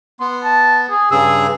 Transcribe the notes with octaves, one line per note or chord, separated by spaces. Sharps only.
B3 C6
A5
G#4
G2 C#3 G#4 E6